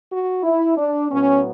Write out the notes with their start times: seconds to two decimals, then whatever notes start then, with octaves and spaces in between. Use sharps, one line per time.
0.10 F#4
0.43 E4
0.76 D4
1.10 A2 F#3 B3 C#4